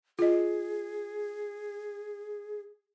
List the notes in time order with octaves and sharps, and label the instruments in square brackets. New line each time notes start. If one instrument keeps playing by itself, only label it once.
[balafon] F4 D#5 [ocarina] G#4